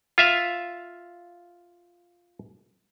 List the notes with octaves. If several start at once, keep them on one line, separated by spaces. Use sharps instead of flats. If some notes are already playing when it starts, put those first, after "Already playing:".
F4 E5 F5